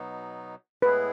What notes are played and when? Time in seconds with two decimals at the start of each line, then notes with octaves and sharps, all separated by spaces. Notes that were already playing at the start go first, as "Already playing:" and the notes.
Already playing: B2 F#3 B3 D#4
0.82 A2 G#3 B3 E4 G#4 B4